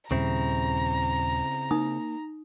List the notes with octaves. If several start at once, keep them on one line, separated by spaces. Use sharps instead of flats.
D#2 A#2 C#3 G3 C4 E4 A#5
A#3 D#4 D#6